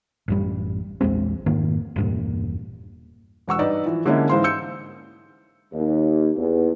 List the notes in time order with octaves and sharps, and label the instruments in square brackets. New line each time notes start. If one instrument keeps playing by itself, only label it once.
[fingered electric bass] A1 F#2 G3
A#1 E2 G#3 C4
F1 G#2 D#3 A#3
E1 G2 A#2
[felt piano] E1 F#5 C#6 E6
G2 D#4 B4 D5
E3 F3
D3 G#3 A#3 C#4 D4 E4
G#2 E3 C5 F5 C6
E6 G6 C#7
[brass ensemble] D#2
E2